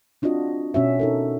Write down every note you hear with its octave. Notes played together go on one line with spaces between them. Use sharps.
C4 D4 F4 F#4 D#5
B2 C#4 F#4 E5
D#4 A4 A#4